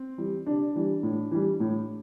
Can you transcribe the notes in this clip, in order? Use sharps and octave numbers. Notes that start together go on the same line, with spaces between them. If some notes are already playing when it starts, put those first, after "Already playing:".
Already playing: C4
E3 G3
C3 D4
E3 G3
A2
E3 G3
A2